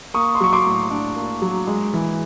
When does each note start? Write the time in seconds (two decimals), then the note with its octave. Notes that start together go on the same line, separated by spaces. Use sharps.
0.14 A#3 C#6 D#6
0.35 C6
0.41 F#3 C#6
0.53 C6 D6
0.66 A2
0.91 D4
1.16 A#3
1.42 F#3
1.67 G#3
1.93 E3